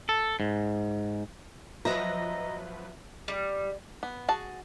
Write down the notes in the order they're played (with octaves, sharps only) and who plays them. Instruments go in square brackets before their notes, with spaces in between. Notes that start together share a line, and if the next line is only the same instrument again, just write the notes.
[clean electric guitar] A4
G#2
[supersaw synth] F3 F#3 B4 [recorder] D#5 [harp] E5 [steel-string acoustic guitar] A#5
[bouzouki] G3
[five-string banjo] B3
F#4 G#4 A5